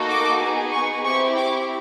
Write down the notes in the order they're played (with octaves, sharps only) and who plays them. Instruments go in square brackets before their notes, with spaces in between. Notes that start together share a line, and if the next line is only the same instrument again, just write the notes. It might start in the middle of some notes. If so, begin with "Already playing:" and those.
Already playing: [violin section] A#3 D#4 F#4 A4
D6
B3 D#4 G#4
C#6
C4 E4 G4 C#6
D6